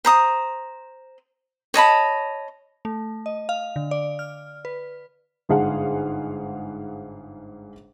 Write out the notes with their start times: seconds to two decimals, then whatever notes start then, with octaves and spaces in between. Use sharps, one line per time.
0.05 C5 A#5 D#6
1.74 C#5 D#5 A5 B5
2.85 A3
3.26 D#5
3.49 F5
3.76 D3
3.91 D5
4.19 F6
4.65 B4
5.49 G1 G#2 G#4 F5 F#5